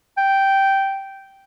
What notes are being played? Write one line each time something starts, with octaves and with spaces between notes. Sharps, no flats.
G5